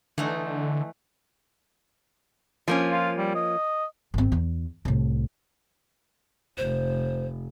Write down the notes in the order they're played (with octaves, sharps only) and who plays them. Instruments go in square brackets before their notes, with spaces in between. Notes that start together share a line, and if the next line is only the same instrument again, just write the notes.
[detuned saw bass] D3 [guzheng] E3 A3 D#4
[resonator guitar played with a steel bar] F3 A#3 C#4
[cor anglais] F4
G3
D#5
[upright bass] G#1 C4
E2
C2 A2
[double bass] F1 [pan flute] C5